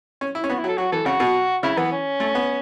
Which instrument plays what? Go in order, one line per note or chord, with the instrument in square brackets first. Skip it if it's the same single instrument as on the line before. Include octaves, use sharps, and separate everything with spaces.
[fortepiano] C#4
E4
C#4
[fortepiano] B3 [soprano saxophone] F#4
[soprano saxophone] E4
[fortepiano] F#3
[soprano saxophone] A4
[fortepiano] F#3 [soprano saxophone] F#4
[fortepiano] E3 [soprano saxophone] A4
[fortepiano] C#3 [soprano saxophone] F#4
[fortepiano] B2
[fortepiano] C#3 [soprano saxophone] E4
[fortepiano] E3 [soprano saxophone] B3
[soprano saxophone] C#4
[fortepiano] A3
B3